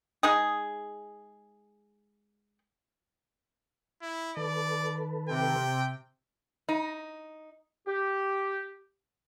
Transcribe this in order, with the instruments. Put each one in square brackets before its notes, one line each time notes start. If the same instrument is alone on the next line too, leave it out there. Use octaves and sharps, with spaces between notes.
[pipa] G#3 D#4 G#4
[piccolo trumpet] E4
[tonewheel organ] D#3 A4 B4 [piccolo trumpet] D5
[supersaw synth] C3 [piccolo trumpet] G5
[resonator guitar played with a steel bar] D#4
[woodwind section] G4